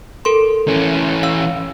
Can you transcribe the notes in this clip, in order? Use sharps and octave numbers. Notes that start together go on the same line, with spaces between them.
A4 A#4 C6
E3 C#4
F5 E6